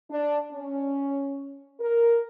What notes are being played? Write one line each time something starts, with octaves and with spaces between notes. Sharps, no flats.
D4
C#4
A#4